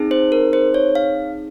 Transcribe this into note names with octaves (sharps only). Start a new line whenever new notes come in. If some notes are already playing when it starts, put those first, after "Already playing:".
Already playing: C4 D#4 G#4
C5
A#4
C5
C#5
F5